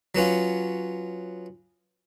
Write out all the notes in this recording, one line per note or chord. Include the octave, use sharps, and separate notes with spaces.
F#3 B3 C#4 F4